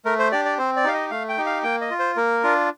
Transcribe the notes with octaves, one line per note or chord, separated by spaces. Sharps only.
A3 A#4
C5
D4 G4 D5
D5
C4 C5
D5
D#4 G4 F5
D#5
A3 F5
G5
D#4 G4
F5
A#3 G5
D#5
F4
C5
A#3 A#4
D4 F4